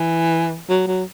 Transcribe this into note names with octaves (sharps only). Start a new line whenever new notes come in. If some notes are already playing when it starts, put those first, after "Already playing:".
Already playing: E3
F#3
F#3